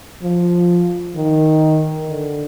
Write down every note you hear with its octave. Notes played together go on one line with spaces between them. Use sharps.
F3
D#3
D3